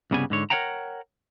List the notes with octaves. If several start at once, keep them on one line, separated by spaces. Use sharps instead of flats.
C2 G2 C#3 G3 B3 G#5
G#2 D3 C#5
A#4 C5 C#5 F#5 G5 A#5